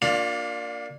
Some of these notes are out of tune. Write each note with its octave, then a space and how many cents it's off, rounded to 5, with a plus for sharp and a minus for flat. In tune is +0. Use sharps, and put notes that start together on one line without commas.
A#3 +0 D4 +0 F4 +40